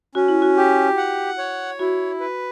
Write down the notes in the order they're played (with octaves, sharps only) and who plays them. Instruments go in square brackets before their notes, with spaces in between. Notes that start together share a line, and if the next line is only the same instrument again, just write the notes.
[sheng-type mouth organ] C#4 [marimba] F#4
[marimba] E4
F#4
[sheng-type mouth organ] G4
F#5
C#5
[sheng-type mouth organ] E4 [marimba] F#4
[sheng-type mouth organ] B4